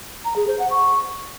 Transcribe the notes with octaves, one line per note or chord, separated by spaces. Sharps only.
A#5
G#4
C5
F#5
C#6